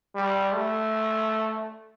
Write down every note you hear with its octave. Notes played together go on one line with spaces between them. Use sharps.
G3
A3